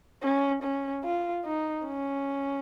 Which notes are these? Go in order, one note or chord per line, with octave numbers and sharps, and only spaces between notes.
C#4
C#4
F4
D#4
C#4